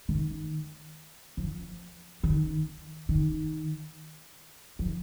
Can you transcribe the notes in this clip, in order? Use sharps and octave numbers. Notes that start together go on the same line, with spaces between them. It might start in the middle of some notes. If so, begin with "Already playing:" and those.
D#3
F3
D#3
D#3
F3